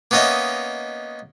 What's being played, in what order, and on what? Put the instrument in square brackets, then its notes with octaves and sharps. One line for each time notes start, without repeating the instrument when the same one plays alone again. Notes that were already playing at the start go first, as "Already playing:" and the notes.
[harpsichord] A#3 B3 C#4 D#4 D#5 E5